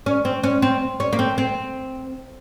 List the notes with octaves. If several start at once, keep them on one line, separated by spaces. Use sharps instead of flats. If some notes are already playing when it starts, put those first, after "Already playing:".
C#4
C4
C#4
C4
C#4
A#3
C4
C4